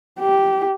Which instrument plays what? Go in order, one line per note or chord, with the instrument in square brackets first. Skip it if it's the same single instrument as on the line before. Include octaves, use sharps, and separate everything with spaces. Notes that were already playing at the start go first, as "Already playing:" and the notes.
[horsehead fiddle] G4